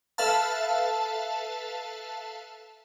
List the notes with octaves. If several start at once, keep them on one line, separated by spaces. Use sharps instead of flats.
A4 B4 E5 F5 A5